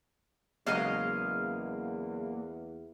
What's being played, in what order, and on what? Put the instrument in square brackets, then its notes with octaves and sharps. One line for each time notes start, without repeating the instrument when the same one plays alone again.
[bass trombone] E2 [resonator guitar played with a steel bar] C#3 F#3 G#3 [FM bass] A#3 [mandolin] D#5 F5